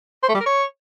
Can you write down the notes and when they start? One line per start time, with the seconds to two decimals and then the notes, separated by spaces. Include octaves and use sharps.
0.23 C5
0.29 A3
0.35 G3
0.40 A#4
0.46 C#5